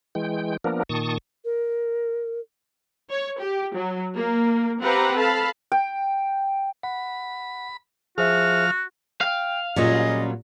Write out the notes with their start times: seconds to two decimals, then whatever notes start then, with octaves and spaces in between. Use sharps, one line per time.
0.15 E3 G#3 G5
0.64 F3 A#3 B3 D4 A#4
0.89 A#2 D#3 A5 C#6 D#6
1.45 A#4
3.10 C#5
3.39 G4
3.76 F#3
4.16 A#3
4.81 C4 G4 B4 F5 F#5 A#5
5.17 A4 F5 A5 B5
5.72 G5
6.83 F#5 B5
8.18 F3 F#4 G#4 C5 E5 F6
9.21 F5 G5
9.76 A#2 F#3 G3 C4 C#4 F4 G#4 D#5